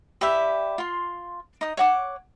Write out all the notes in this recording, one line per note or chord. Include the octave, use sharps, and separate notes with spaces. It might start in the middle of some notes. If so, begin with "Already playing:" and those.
G4 B4 D5 E5
F4 C6
D#4 D#6
C#5 F#5 D6